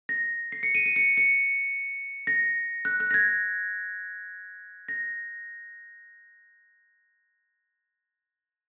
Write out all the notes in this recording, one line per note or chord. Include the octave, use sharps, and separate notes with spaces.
A#6
C7
C#7
D#7
D#7
C#7
C#7
A#6
F#6
F#6
A#6
G#6
A#6